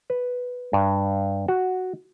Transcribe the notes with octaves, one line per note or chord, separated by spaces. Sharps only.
B4
G2
F#4